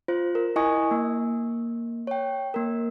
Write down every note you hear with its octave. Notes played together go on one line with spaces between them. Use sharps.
F4 C5
A#4
E4 D#5 G#5 C#6 D#6
A#3
C#5 G5
A#3 A#4